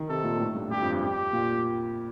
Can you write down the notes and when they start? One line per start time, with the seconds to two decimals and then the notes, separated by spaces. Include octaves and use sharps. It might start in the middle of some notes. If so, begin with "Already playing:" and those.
Already playing: D#3
0.09 C3 A4
0.24 A#2
0.40 A2
0.55 G2
0.71 G2 G4
0.82 F2
0.91 G2
1.02 G4
1.33 A#2